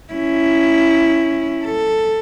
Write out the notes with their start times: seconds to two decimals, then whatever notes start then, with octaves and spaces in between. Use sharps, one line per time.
0.13 C#4 E4
1.64 A4